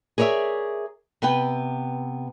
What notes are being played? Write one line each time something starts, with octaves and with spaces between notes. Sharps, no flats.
G#4 A#4 C#5 D5 E5
C3 B3 B4 G5